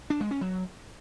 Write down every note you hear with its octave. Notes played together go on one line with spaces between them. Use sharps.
D4
G#3
C#4
F#3